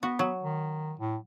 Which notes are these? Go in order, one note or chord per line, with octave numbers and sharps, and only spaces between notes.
B3 F#4
F#3
D#3
A2